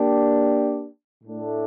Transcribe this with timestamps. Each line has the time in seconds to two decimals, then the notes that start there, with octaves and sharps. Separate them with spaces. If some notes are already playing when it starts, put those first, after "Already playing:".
Already playing: A#3 D4 G4
1.23 A2 A3 D4